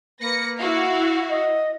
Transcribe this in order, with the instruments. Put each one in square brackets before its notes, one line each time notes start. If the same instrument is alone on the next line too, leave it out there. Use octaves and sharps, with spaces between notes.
[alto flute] A#3 [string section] B4 A#6 C#7
[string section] E4 F#4 F5
[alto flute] D#5